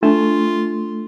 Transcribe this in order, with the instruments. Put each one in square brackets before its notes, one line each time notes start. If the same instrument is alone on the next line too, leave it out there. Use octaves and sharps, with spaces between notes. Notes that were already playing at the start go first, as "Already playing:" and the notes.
[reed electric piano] A3 [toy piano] D4 [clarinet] F4